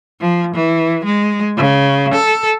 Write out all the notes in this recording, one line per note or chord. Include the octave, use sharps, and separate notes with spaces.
F3
E3
G#3
C#3
A4